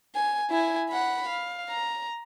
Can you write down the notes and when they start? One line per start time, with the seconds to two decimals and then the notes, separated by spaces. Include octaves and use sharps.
0.15 G#5
0.50 E4 G#5
0.89 F#5 B5
1.28 F5
1.69 A#5